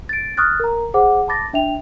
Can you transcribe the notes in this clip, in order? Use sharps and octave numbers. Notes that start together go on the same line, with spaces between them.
A6 D7
C#6 D#6 F6 F#6 A6
A#4 A#5
G#4 C5 F#5 D6
A5 B5 D6 A6 A#6
D4 E5 G5 F7